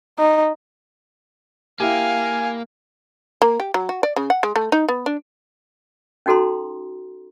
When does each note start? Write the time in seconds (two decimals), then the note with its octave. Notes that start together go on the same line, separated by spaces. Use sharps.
0.19 D#4
1.80 A#3 E4 G4 F5 G#5
3.42 A#3
3.60 G4
3.74 F#3
3.89 F#4
4.03 D5
4.16 C#3
4.30 F#5
4.43 G#3
4.56 A3
4.72 D#4
4.88 B3
5.06 D4
6.26 C#4 D#4 F#4 A4 A#5 C6